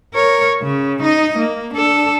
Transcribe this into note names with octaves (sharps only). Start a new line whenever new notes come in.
A#4 C#5
C#3
D#4 D#5
A#3
D4 A4